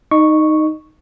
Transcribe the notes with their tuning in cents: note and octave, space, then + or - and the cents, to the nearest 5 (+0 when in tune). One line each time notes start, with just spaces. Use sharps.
D#4 +0 D#5 -30 C#6 +0